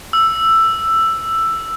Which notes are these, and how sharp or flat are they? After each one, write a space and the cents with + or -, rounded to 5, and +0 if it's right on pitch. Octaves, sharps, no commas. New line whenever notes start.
E6 +10